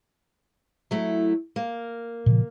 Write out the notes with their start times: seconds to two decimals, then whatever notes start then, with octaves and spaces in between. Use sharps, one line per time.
0.91 F#3 A3 E4
1.56 A#3
2.26 A#2 C#3 F3